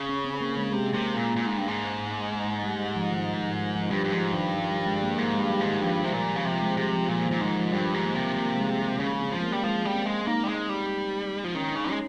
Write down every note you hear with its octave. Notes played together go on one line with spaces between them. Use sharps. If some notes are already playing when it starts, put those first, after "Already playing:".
Already playing: C#3
C#4
C4
A#3
G#3
C3 G#3
C3 A#3
A#2
A#2
G#2
G2
G#2
G3
F3
D#3
F3
F3
G2 G3
G2
G#2 F3
G2 D#3
F3
G3
G#3
A#3
G#2 A#3
G#3
G2
G3
G#2
D#3
G2 F3
C3
A#2 G3
C#3
C3 F3
G#3
C3 G3
F3
A#2 F3
D#3
A#2
G#2 F3
F3
G2 G3
G#2
A#3
C3
A#3
G#3
C#3 C#4
C4
F3
A#3
G3
F3 G#3
G3
C4
G#3
A#3 D#4
G3
G#3
G3
F3
D#3 C#4
C#3 D#4
G#3 C#4